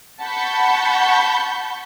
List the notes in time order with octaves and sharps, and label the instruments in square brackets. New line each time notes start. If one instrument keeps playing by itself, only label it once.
[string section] F#5 A5 B5 C#6 G6